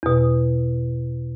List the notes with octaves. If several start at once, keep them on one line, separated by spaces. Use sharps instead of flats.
E2 B2